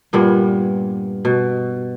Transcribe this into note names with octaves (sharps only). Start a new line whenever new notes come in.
G2 A#2 G3 B3
B2